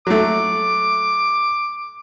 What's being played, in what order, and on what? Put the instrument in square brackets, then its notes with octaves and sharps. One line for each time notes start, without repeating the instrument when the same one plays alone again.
[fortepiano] F#3 A3 [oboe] D6